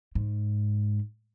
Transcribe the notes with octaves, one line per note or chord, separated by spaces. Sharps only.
G#2